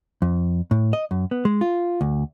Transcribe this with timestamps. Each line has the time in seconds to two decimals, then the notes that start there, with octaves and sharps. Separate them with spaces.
0.22 F2
0.71 A2
0.93 D#5
1.11 F#2
1.31 B3
1.45 G#3
1.61 F4
2.01 D2